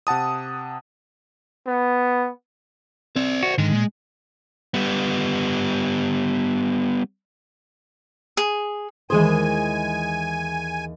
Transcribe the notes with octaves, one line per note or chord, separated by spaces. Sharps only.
C3 F#5 A5 D#6
B3
C4 C5 D5
F#4
G#2 D3 D#3 G#3
A#2
G3 B3
G#4
D#2 E3 G#3 G#4 C5 G#5 D#6